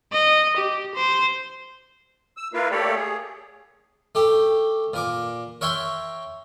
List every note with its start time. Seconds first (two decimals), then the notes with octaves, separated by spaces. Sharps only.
0.12 D#5
0.57 G4
0.95 C5
2.37 E6
2.53 A#3 E4 F4 A#4 B4 F5
2.71 A3 A#3 G4 A4 C#5 D5
2.95 G#4
4.15 A3 G4
4.93 A#2 A#4 D6
5.61 A#4 C#5 E5 G5 C6